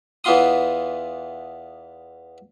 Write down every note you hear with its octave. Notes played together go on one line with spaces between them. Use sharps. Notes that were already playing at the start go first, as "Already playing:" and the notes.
E2 E3 B3 F4 C6 D#6